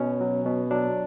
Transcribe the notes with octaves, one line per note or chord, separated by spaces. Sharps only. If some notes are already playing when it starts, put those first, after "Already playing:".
Already playing: B2 C#4
F#3
B2
F#3 D4